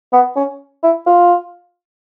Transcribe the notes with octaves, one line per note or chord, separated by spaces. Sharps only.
B3
C#4
E4
F4